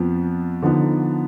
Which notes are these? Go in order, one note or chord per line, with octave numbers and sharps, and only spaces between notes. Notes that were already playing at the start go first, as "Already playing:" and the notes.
Already playing: F2 F3 B3
D3 F3 B3 D#4